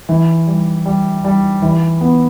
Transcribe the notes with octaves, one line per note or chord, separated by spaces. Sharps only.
E3
G3
G3
G3
E3
B3